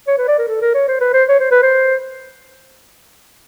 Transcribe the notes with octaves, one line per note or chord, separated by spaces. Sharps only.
C#5
B4
D5
A#4
A4
A#4
C#5
C5
B4
C5
C#5
C5
B4
C5